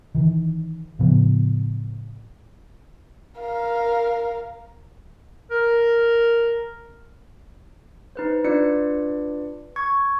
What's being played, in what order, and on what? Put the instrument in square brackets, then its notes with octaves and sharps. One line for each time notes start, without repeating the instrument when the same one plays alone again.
[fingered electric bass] D#3 E3
A2 C#3 F3 B3
[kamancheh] A#4 F5
[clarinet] A#4
[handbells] D#4 B4 C5
D4 F4 B4 D5 C#7
C#6 G#6